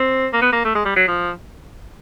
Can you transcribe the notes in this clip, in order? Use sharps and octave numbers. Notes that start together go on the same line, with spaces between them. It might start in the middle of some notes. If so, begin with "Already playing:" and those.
Already playing: C4
A#3
B3
A#3
A3
G#3
G3
F#3
F3